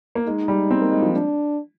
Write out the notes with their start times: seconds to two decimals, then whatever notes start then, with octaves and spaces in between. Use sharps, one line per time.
0.15 A#3
0.27 G#3 D#4
0.48 G3
0.71 C4
0.81 A#3
0.92 G#3
1.02 F3
1.13 D4